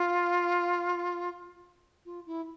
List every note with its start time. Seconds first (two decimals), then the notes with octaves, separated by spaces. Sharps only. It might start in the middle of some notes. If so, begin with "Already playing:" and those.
Already playing: F4
2.05 F4
2.26 E4